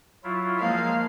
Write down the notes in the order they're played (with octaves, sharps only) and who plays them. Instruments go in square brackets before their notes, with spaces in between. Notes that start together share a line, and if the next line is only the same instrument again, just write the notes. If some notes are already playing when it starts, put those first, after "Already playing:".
[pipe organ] F#3 E4 F4
[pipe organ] F3 G#3 [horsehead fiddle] A#3 F5